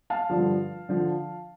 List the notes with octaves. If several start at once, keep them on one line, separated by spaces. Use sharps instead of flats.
F5 A5
G2 D3 F3
D3 F3